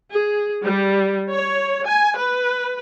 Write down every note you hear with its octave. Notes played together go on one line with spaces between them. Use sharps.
G#4
G3
C#5
G#5
B4